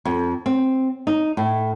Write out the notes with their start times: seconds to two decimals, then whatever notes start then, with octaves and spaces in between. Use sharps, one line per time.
0.05 F2
0.46 C4
1.07 D#4
1.37 A2